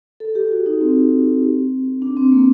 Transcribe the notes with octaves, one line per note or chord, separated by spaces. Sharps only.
A4
G4
F#4
D#4
C4
D4
C4
A#3